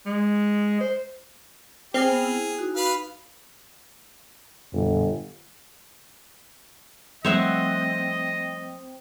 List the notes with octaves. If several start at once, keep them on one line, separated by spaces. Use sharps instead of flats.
G#3
C5
C4 G#4 C5 F6
B3
E4
D#4 F#4
B4 F5 B5
G1 F2 A#2
F3 G3 A3 C4 C#5 D#5 E5 F#5